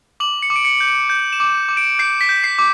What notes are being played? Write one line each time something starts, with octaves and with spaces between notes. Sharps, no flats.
D6 F#7
C#7
D6
D7
C#7
G6
D7
G6
E7
D6
D6
D7
G6 C7
B6
G6
C7
D6